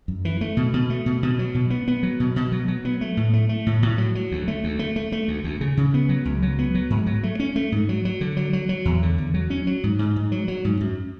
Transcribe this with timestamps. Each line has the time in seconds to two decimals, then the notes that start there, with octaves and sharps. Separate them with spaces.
0.08 F#2
0.25 E3
0.41 A3
0.57 B2
0.73 B2
0.90 A3
1.06 B2
1.23 B2
1.39 F#3
1.54 B2
1.70 B3
1.88 B3
2.03 F#3
2.20 B2
2.36 B2
2.52 F#3
2.68 F#3
2.85 B3
3.01 A3
3.17 A2
3.33 A3
3.49 A3
3.66 A2
3.83 A2
3.98 F#3
4.15 F#3
4.31 D2
4.48 A3
4.64 D2
4.79 A3
4.96 A3
5.12 A3
5.28 D2
5.44 D2
5.61 C#3
5.77 C#3
5.94 B3
6.09 F#3
6.25 C#2
6.42 F#3
6.59 B3
6.75 F#3
6.90 G#2
7.06 F#3
7.23 A3
7.40 C#4
7.56 A3
7.72 G#2
7.89 F#3
8.05 F#3
8.21 D3
8.37 F#3
8.53 F#3
8.69 F#3
8.85 E2
9.03 D3
9.18 E2
9.34 F#3
9.50 C#4
9.67 F#3
9.84 G#2
9.99 G#2
10.16 G#2
10.32 F#3
10.48 F#3
10.65 G#2
10.81 F#2